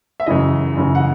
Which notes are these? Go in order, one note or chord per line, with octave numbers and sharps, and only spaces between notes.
E5
F#2 C#3 E3 D#5
F#2 C#3 E3
F#5